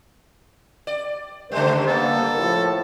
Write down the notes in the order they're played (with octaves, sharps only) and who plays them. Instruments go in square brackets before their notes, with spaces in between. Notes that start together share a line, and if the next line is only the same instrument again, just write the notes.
[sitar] D5
[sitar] C#3 G3 [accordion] A3 C5 [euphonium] A#4
[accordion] A#3 B3 [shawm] A4
[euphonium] A2 [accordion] F3